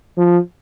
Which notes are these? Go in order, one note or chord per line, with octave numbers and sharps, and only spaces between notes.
F3